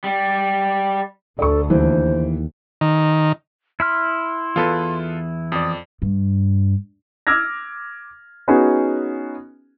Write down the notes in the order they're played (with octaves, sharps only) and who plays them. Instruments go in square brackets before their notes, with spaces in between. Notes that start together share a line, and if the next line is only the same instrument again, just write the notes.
[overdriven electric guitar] G3
[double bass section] D2 [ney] A4 [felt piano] D5 C#6
[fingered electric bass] D#2 [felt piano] E3 [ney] C5
[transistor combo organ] D#3
[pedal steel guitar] E4 B5 F6 [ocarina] C6
[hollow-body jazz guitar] E2 B3 [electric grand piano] F4 A4 B4
[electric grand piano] F2 D5 [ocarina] D#6
[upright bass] G2
[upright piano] D6 E6 F6 G#6 A#6
B3 C#4 D#4 F#4 G#4